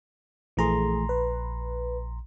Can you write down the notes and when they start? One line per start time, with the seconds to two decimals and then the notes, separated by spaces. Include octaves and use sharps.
0.57 A#1 E3 A3 G#4 A#5 C6
1.09 B4